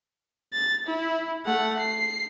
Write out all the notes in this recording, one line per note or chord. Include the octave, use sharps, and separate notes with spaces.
A6
E4
A3 F#5
C7